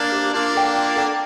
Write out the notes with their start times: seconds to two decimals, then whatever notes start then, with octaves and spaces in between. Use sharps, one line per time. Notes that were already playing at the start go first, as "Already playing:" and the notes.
Already playing: A#3 D4
0.12 G4 C5 E5
0.33 A#3 D4 F4
0.54 A4 D5 G5
0.75 F4
0.96 A4 D5 G5